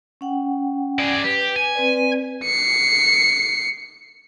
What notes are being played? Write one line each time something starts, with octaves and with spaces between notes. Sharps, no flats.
C#4 F#5 G5
G#4 D5
G4 B4
G#5
C4 B4 D5
C7 C#7